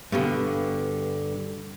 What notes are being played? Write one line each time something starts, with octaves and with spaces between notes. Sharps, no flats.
G2 B2 D3